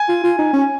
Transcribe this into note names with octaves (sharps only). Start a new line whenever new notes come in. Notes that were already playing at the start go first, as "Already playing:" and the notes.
Already playing: G#5
F4
F4
D#4
C#4